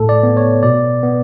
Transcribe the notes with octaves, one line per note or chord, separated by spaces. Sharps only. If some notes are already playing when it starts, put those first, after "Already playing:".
Already playing: A2 A3 A4
D5
B3
C#5
B2 D5
B3